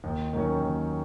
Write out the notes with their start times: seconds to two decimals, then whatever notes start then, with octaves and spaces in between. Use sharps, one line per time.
0.04 D#2
0.33 D#3 F#3 C#4
0.61 D#2